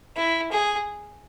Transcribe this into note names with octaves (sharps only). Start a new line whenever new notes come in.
E4
G#4